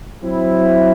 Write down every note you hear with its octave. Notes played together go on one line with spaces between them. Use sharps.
F#3 C4 E4